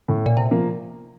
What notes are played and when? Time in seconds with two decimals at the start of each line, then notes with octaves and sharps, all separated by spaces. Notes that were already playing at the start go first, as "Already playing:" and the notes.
0.08 A2
0.26 A#2
0.37 C3
0.51 F3 A#3